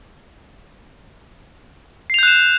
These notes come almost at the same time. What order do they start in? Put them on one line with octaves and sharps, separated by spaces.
C7 F7 G6 F#6 E7